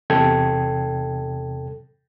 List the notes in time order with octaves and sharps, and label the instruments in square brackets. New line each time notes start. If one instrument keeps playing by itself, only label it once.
[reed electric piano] E2 C3 A4 G5 G#6